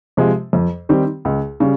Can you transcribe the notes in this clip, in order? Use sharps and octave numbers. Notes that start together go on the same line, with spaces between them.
C3 F3 G#3
F2
D#3 G3 C4 G4
C#2
C#3 G3